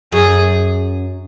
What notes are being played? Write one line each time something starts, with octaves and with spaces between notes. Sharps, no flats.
F#2 G#4